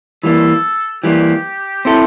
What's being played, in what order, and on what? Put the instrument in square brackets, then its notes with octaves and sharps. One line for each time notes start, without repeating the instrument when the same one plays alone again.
[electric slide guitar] E3 G3 A#3 [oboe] A4
[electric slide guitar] E3 G3 A#3 [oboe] G4
[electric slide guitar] C4 E4 A4